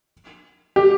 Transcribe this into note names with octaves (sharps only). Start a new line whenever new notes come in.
G4